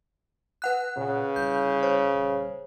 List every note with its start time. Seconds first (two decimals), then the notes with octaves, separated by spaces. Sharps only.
0.62 B4 F#5 F#6
0.97 A#2 C#3
1.36 C2 G6
1.83 C5 C#5
2.14 D#1